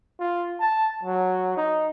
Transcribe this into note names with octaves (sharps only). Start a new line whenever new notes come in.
F4
A5
F#3
D#4